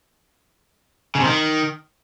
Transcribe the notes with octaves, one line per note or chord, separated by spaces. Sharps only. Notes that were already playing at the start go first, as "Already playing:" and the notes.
C#3
C3
D#3